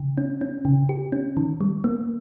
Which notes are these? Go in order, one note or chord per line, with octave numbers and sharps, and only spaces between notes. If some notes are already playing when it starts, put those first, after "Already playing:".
Already playing: C#3
C#4
C#4
C#3
G4
C#4
D#3
G3
A#3